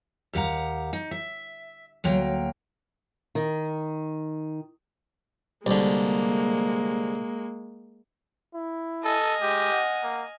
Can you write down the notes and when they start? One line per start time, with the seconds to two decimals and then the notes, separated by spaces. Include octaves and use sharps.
0.33 D#2 G4 F5 F#5 A#5
0.93 D#4
1.11 E5
2.04 D2 F#3 A#3 G5
3.35 D#3
5.66 C2 D3 G#3 A#3
8.54 E4
9.04 A4 D#5 G#5 F6
9.42 G#3 G4
9.72 F#5
10.03 A#3